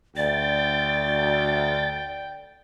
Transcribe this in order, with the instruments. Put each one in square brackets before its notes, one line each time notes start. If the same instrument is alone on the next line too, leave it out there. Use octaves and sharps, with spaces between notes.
[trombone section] D2 [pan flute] D5 [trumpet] G5 [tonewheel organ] A6